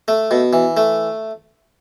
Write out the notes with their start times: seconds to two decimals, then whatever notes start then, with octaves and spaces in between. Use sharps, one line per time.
0.08 A3
0.31 B2
0.53 E3
0.77 A3